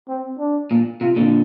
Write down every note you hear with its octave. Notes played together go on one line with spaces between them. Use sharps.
C4
D4
A#2
C3 F4
A#2 D3